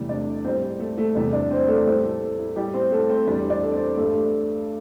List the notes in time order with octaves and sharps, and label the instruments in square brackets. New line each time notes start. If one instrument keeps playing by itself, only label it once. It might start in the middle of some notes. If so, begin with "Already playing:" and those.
Already playing: [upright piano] E2 C3 E3 G3 A3 A4
D4 D5
A2 E3 G3 C4 C5
A3 A4
A3 A4
E2 C3 E3 G3
D4 D5
C4 C5
A3 A4
A2 E3 G3 C4 C5
A3 A4
E4
A2 G3 G4
C4 C5
A3 A4
C4 C5
E2 E3 G3 D4 D5
D4 D5
A4
C4 C5
G2 G3 A3 A4